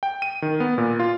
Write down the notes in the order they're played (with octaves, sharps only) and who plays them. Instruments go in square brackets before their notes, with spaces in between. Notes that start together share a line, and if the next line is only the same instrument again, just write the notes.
[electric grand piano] G5
D#7
D#3
B3
A#2
F4